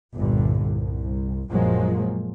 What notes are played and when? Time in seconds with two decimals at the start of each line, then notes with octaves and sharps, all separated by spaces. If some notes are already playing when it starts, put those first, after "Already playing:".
0.15 G1 C2 G2 A#2 D3
0.64 C2
1.50 A#1 F#2 F3 F#3 G#3 A#3